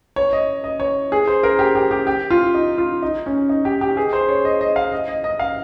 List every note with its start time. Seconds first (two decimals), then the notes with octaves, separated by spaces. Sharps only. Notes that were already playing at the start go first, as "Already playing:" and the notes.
0.16 C#5
0.33 D#5
0.64 D#5
0.80 C#5
1.12 G#4
1.27 C5
1.43 A#4
1.59 G4
1.75 G4
1.91 G4
2.07 G4
2.30 F4
2.54 D#4
2.78 F4
3.02 D#4
3.26 C#4
3.49 D#4
3.65 G4
3.81 G4
3.97 G#4
4.13 C5
4.29 C#5
4.45 D#5
4.61 D#5
4.76 F5
4.92 D#5
5.08 D#5
5.24 D#5
5.39 F5